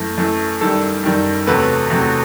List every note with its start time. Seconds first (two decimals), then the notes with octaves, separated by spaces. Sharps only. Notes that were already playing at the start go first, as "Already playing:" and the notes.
Already playing: F#2 E3 A3
0.17 F#2 E3 A3
0.61 F#2 D#3 G3 A4
1.04 F#2 D#3 G3
1.47 E2 C3 F#3 A3 B4
1.90 E2 C3 F#3 A3